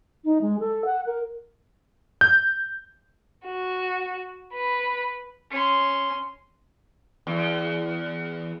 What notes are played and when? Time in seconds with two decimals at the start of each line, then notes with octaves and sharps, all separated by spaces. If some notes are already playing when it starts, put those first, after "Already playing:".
0.24 D#4
0.41 G#3
0.59 A4
0.85 F#5
1.06 A#4
2.21 G6
3.46 F#4
4.54 B4
5.51 C#4 C6
7.27 E2